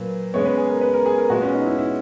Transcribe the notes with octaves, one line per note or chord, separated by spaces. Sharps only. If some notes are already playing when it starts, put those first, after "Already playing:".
Already playing: A#2 F#3 A#3 B4
C#3 G#3 B3 C#5
B4
G#4
A#4
B4
A#4
G#4
A#4
A#2 G#3 B3 F#4
C#4
D#4
E4
E4